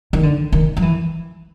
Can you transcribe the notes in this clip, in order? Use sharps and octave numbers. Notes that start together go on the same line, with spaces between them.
D#3
D3
D#3
F3
E3